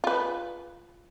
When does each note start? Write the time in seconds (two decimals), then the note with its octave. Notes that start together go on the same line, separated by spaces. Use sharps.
0.04 F4 B4